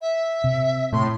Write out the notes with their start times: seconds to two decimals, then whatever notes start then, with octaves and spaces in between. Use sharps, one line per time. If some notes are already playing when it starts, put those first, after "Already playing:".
0.01 E5
0.44 C3
0.93 A2 C6